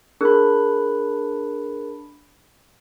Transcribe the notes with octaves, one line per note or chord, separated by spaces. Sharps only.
D4 G#4 A#4 B5 F#6